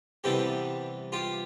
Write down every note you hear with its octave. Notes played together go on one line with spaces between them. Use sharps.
C3 E3 G3 B3 G4 A4
F4 G4